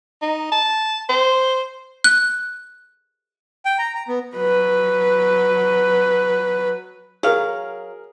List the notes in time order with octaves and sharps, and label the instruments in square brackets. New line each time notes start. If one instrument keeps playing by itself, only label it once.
[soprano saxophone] D#4
A5
C5
[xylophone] F#6
[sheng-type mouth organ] G5
A#5
A#5
B3
[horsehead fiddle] F#3 B4
[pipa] F#3 F5 [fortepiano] G#4 A#4